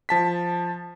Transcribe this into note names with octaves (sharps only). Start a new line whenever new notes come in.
F3 A5 B6